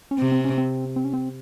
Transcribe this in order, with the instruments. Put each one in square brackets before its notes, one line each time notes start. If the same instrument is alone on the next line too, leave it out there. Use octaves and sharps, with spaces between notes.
[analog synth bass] C#4
[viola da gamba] C3 [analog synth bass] C4
[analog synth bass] C4
C#4
C4
C4
C#4
C4